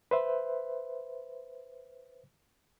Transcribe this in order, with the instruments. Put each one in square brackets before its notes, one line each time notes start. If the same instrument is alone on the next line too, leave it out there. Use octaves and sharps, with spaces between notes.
[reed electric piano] B4 C5 E5